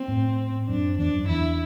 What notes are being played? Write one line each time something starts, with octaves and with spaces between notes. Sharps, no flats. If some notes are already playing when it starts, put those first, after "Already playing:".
Already playing: C4
A2
F#2 D4
E2 D4
F#2
E2 E4